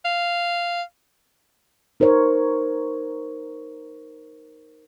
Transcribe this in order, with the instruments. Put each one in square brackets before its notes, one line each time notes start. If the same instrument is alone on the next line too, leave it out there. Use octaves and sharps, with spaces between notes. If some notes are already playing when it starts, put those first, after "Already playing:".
[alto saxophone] F5
[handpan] D#4 A#4 C5 C#5